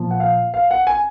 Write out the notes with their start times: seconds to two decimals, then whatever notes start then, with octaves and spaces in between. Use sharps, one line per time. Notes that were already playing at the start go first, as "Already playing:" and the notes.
Already playing: A#2 F3
0.11 F#5
0.20 F5
0.54 F5
0.71 F#5
0.87 G#5